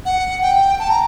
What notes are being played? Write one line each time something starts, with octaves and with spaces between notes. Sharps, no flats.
F#5
G5
A5
A#5